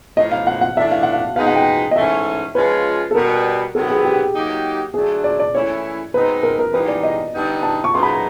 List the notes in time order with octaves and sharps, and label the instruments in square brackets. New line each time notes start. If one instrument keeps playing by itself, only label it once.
[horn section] A2 F3 A#3 [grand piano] D#5
[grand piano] F5
F#5
F#5
[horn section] A2 E3 A3 D4 [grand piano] E5
[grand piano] F5
F#5
F5
[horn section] B2 G#3 B3 D#4 [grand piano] F5
[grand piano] F#5
G5
D#5
[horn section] G#2 E3 A3 C#4 [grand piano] E5
[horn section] F3 G#3 C#4 F4 [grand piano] B4
[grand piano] A4
[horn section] B2 G3 B3 [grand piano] A#4
[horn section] C3 D#3 F#3 B3 [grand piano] A4
[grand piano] G#4
G4
[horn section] F#3 A#3 D#4 G4
[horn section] D3 F#3 A3 D4 [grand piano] G#4
[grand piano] D5
D5
[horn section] E3 A3 C#4 E4 [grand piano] C#5
[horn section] B2 G#3 C4 D#4 [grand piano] B4
[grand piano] A#4
A#4
[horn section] G#2 E3 G3 A#3 D#4 [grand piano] B4
[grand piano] D5
D#5
[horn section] D3 G3 B3 D#4
[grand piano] A5
C#6
[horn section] F#2 C#3 F#3 B3 D#4 [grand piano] C6
[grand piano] B5
A#5